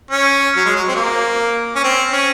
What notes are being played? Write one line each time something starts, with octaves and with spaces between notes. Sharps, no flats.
C#4
F#3
G#3
F#3
C4
A#3
C#4
C4
C#4